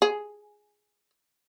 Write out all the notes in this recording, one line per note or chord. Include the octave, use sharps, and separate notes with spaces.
G#4